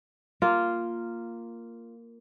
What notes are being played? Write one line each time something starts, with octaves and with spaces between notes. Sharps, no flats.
A#3 F4